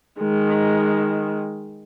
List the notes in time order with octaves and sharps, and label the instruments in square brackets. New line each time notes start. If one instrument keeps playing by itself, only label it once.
[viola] D#3 G#3